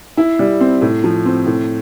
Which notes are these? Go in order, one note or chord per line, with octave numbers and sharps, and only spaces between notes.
E4
G3
C4
A2
F3
C4
A2